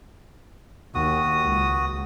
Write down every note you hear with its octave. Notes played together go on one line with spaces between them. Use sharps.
D#2 F#4 D#6
C#2